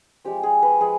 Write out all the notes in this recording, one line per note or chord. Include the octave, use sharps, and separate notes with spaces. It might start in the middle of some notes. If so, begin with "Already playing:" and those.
F3 G#3 C4 G4
G#4
B4
F3 G#3 G#4